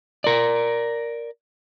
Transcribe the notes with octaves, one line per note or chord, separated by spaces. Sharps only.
A#4 D5